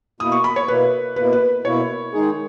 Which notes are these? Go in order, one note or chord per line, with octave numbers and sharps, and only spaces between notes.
B2 A#3 E4 D#6
C#6
B5
C#5
B2 A#3 E4 B4
B2 A#3 E4 B4
B4
B2 A#3 E4 C#5
D#3 G#3 D#4 G#4